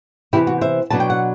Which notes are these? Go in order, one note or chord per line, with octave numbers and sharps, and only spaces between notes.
C3 E3 B3 E4 G4
F#4
C5 E5
B2 F#3 B3 D4 A5
G5
F#5